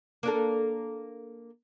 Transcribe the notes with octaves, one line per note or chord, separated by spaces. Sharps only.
A#3 D4 A4